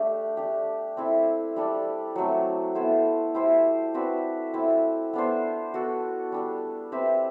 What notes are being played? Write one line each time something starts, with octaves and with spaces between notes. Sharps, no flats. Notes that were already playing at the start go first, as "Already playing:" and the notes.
Already playing: A3 D4 G4
A3 D4 G4
C4 E4 A4
G3 D4 A4 D5
F#3 A3 C4
B3 E4 A4 C5
E4 G4 C5 E5
C4 F#4 B4 D5
C4 E4 A4
B3 D4 A4 C5
B3 F#4 A4
G3 D4 A4
C4 G4 B4 E5